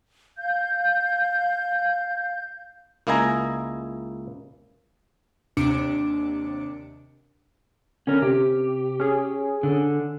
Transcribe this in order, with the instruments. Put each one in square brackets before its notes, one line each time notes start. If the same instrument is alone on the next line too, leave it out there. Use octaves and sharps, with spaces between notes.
[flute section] F5 G6
[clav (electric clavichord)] C#2 A#3 E4 D#5 G#5 A#5
[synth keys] D#2 C3 D4 D6 C#7 D7
[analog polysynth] D3 [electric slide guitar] C#4 A#4
[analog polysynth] C3 [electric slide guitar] G4
[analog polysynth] C#4 G#4
[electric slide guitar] D3